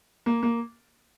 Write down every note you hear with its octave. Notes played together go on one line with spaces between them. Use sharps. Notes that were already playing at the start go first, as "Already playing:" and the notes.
A#3
A#3